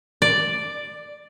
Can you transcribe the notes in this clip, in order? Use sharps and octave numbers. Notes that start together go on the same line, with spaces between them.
D5